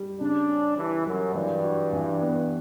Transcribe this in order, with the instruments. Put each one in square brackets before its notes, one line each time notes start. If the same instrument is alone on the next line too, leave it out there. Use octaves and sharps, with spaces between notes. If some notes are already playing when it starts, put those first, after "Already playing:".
Already playing: [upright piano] G3
[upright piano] C#3 [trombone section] D4
[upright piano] C#4
[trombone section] E3 [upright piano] G4
[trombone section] F#2 [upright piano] F#3
[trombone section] G2 [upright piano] E3
[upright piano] F#4
E3
B3